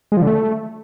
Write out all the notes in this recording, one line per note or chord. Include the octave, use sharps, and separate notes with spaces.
G#3
F3
D3
A3